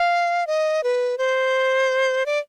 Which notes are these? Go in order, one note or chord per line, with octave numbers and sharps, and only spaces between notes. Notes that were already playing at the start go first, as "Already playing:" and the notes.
Already playing: F5
D#5
B4
C5
D5